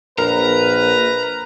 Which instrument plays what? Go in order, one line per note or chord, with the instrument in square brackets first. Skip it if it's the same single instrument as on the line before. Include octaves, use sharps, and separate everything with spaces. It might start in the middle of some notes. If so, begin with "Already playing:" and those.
[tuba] A#1 [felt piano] A#4 [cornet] B4 [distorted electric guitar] A#5